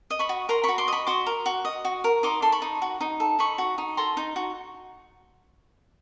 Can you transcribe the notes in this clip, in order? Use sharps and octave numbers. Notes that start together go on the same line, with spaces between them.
D#5
B5 C#6
F#4
A#4 A#5 C6
F#4 B5 C#6
C6 D6
D#5 B5 C#6
F#4 C6 D6
A#4
F#4
D#5
F#4
A#4
D#4 C6 D6
A4 C6
B5 C#6
D#4
F#4
D#4
A4
D#4 B5 C#6
F#4
D#4
A4 A#5 C6
D#4
F#4